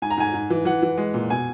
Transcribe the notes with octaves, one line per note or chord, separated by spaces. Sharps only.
G#2 G#5
A#5
G#2 G#5
G#2
E3
E3 F#5
E3
G#3
A#2
B2 G#5